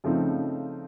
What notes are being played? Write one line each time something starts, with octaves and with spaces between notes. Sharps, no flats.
C#3 F3 A3 C4 D#4